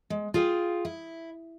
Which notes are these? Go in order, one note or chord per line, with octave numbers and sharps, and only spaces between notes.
G#3
F4 G#4 F5 G5
E4